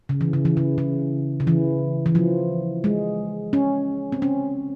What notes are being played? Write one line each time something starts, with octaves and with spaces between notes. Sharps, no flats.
C#3
E3
C#3
E3
C#3
C#3
C#3
E3
E3
F3
G#3
C#4
C4
C#4